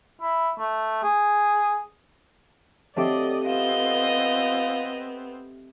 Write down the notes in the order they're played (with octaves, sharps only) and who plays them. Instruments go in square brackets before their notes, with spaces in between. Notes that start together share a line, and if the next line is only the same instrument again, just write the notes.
[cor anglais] E4
A3
G#4
[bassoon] F#3 [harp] A3 C4 G4 [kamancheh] D5 D#5
[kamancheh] B3 C4 [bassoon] F4 [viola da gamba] D#5 [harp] D#7 E7